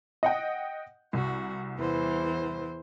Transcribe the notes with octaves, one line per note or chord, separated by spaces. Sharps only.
D#5 F#5 G5
C2 F#4
E2 E3 C5